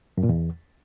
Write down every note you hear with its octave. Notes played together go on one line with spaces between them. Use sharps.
F#2
A#2
E2